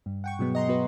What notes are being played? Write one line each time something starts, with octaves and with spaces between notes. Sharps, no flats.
G2
F#5 G5 C#6
B2 F#3 G#3 B3
D#5 A#5 C6
B3 F#4 B4